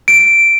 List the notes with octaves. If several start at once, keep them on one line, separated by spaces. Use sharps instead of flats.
D7